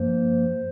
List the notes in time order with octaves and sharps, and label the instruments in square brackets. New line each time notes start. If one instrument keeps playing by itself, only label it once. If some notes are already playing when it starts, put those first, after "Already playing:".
Already playing: [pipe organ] G2 F3 A#3 C5